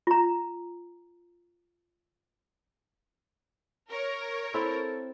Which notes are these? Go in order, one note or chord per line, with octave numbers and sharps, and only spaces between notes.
F4 A#5
A#4 C#5
C4 E4 A4